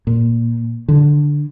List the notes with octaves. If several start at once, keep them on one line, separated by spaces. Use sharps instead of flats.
A#2
D3